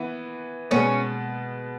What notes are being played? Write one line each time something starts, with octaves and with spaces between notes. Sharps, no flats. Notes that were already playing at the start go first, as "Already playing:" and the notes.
Already playing: E3 B3 E4
B2 G#3 B3 C#4